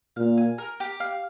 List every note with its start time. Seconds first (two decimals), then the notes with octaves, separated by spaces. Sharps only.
0.16 A#2 F5
0.38 G#5
0.58 A#4
0.80 G4
1.00 F5